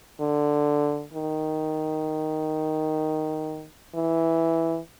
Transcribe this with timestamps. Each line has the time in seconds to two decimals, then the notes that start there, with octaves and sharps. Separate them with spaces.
0.20 D3
1.13 D#3
3.95 E3